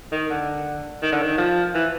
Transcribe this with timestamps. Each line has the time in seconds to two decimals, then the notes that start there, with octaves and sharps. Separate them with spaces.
0.12 D#3
0.30 D3
1.02 D#3
1.12 D3
1.22 D#3
1.38 F3
1.74 E3